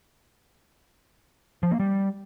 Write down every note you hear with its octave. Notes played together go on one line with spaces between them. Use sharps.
F3
A#3
G3